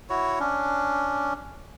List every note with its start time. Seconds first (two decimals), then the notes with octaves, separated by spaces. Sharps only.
0.10 E4 F#4 C#5
0.40 C#4 D4